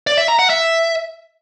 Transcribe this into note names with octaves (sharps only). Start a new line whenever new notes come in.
D5
E5
A#5
F#5
E5